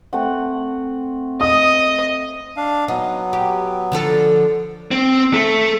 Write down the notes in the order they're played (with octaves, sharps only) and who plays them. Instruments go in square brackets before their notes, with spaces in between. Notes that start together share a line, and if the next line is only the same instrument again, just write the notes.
[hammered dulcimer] A3 C4 F#5
[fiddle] D#5 [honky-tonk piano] D#6
[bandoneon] D4 F5
[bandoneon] F#3 B3 [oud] D#4
[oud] G4
D3 F3 A4
[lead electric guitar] C4
A3